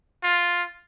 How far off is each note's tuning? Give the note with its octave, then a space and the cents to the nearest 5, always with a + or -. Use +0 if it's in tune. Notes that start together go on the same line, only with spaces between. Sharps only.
F4 +5